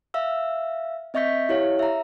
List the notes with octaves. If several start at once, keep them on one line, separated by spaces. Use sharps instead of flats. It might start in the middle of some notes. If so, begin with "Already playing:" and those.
E5 F5 E6
C4 D#5 E5 C#6 G6 B6
E4 G4 C#5 F5
E5 A#5